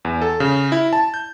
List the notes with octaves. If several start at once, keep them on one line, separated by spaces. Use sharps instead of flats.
E2
A4
C#3
E4
A5
G6